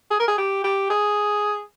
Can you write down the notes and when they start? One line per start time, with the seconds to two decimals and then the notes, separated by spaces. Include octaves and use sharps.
0.11 G#4
0.20 A#4
0.28 G#4
0.38 G4
0.64 G4
0.90 G#4